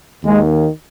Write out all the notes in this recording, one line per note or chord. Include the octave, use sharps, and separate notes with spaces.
D#2 D#3 G#3